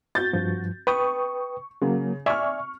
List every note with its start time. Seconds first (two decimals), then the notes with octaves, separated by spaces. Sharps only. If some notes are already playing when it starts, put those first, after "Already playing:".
0.15 F#4 G6 A6
0.33 G2 F3
0.87 B4 G5 C#6 D#6
1.82 C#3 F#3 A#3
2.26 D5 E5 G#5 C#6 F6